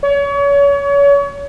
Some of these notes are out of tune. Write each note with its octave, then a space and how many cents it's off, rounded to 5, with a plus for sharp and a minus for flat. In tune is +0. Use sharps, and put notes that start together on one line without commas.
C#5 +30